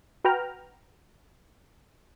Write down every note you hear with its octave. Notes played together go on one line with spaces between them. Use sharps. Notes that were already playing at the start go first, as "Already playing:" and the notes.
F#4 B4 G5 A#5 F6